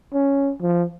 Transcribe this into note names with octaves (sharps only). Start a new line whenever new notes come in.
C#4
F3